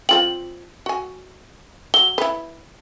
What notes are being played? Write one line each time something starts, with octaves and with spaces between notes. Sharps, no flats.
C4 F4 G5 F#7
F#4 G#5
F#3 G7
E4 B4